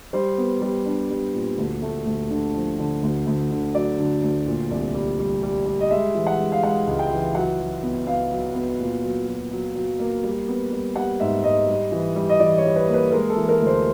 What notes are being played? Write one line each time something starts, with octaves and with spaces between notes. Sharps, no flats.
G3 C5
B3
G3
D4
G3
A#2
D2
A3
D2
D3
F3
D3
D2
D2
D3
F#3 D5
D3
D2
A#2
C2
G3
G3
G3
G3
D#5
G#3 E5
E3
F#5
G#3
F5
G#3 F#5
C#2
G5
E3
F#3 F#5
F#3
B3
B3 F5
F#3
B3
A#2
F#3
F#3
F#3
F#3
A#3
G3
B3
G3
G3 F#5
G#2 E5
G#2 D#5
G3
E3
G3
D#5
E3 D5
C#5
G3
B4
A#3
B4
G#3 A#4
A4
E3
A#4
D2
C5